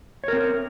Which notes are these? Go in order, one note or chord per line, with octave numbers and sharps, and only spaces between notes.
C4 A#4 C#5